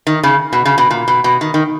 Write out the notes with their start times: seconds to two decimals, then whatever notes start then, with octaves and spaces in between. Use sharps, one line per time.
0.07 D#3
0.23 C#3
0.53 B2
0.65 C#3
0.78 B2
0.91 A#2
1.08 B2
1.24 B2
1.41 D#3
1.54 D#3